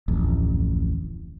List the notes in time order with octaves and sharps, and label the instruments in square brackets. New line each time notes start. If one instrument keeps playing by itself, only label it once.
[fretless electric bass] D1 A1 F2